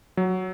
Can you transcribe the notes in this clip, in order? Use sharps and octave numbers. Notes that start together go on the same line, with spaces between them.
F#3